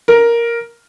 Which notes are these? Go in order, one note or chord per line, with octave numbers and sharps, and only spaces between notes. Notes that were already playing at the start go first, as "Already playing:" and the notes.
A#4